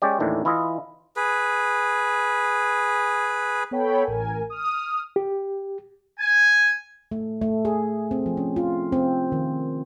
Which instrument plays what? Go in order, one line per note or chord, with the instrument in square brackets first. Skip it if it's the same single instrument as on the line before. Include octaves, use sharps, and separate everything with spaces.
[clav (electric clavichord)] G#3 C#4 G4 D5
D#2 A2 D#3 E3 D4
E3 E4 F4 D#5
[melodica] G#4 B4
[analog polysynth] B3 A4 C#5 G5 B5
A1 A#4 G#5
D#6 F6
[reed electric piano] G4
[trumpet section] G#5
[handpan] A3
A3
G#4
C4
F3
C#4
F4
C4
D#3